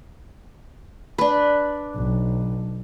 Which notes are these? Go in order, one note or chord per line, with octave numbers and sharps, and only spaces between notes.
D4 B4
B1